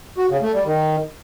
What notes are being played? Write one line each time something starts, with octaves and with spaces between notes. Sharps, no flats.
F#4
C#3
A3
G3
D#3